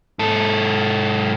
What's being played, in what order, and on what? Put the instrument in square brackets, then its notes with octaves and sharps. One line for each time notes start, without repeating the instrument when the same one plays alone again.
[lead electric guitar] G#2 A4